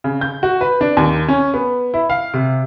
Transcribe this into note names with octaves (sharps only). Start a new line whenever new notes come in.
C#3
G6
F#4
B4
D4
D#2
C#4
B3
E4
F5
C3